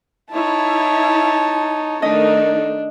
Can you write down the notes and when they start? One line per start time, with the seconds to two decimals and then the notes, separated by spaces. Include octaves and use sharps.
0.33 D#4 E4 C#5 A5
2.02 D#3 A3 D4 D#4 D#5